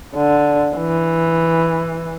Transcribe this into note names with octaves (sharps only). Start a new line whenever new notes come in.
D3
E3